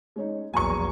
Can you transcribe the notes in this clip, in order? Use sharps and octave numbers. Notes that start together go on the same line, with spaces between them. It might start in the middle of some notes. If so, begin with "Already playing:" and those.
G#3 C#4 D#4
A#1 E2 F#3 G#5 A#5 C#6 C#7